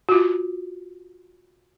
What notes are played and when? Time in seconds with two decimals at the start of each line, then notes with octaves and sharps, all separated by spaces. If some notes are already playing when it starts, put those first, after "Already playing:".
0.09 F4 F#4